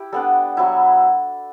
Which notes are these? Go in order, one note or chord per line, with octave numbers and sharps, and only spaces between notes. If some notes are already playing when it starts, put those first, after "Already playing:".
Already playing: E4 G4
G3 B3 D4 A4
F#3 B3 E4